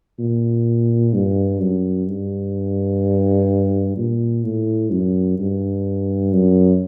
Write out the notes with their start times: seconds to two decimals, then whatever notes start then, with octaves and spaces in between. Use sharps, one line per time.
0.19 A#2
1.14 G2
1.61 F#2
2.08 G2
3.97 A#2
4.45 A2
4.91 F#2
5.39 G2
6.33 F#2